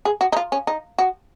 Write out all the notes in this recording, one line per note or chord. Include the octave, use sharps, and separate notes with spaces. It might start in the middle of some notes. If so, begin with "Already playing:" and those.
G#4
F#4
D#4
F4
C#4
D#4
F#4